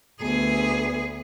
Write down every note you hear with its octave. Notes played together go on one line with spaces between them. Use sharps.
D2 B3 G#4